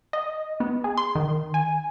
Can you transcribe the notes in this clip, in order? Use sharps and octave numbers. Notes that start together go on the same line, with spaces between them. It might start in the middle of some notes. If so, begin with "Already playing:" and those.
D#5
B3
G#4
C6
D#3
G#5